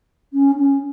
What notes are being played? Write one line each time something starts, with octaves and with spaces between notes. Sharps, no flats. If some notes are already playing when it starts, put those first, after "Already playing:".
C#4
C#4